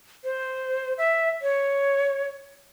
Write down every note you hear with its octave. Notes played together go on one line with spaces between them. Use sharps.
C5
E5
C#5